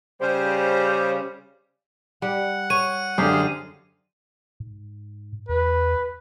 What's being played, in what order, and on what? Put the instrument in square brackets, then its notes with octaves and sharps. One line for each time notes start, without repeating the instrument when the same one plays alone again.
[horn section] C#3 G3 [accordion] C5
[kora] G3 [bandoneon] F#5
[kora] C#5 [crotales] D#7
[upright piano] F#2 D3 [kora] G4 [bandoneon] G#4 C5 F5
[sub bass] G#2
[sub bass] E2 [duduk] B4